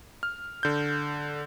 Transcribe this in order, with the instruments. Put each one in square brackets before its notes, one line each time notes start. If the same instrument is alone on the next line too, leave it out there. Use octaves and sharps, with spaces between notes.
[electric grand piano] F6
D3 G6